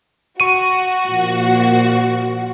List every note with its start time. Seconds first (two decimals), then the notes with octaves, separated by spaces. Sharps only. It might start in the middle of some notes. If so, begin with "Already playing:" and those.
0.40 F#4 C#6 D#7
1.08 A#2 F3 A#3